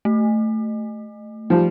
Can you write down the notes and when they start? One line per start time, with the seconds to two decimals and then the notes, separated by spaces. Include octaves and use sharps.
0.05 A3
1.50 F3 G3